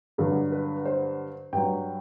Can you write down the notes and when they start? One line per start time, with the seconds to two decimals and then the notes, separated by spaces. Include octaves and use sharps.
0.18 G2 D3 F#3 A4
0.52 B4
0.85 C5
1.53 G2 F#3 G5